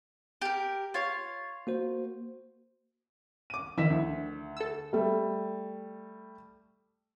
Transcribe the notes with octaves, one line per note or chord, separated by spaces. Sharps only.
G4 A#4
F4 C#5
A#3 F#4 C5
D6 D#7
D#3 F3 E4 B6 E7
D2
A4 E6
G3 A3